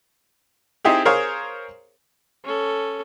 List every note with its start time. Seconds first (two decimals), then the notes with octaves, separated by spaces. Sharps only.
0.85 C4 D#4 E4 G4 G#4
1.05 G#4 A#4 C5 C#5 F5
2.44 C#4 A4